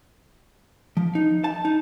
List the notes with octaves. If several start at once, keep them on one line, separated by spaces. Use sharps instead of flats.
F3
D#4
A5
D#4